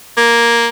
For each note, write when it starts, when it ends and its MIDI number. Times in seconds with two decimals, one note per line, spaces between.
0.17 0.69 58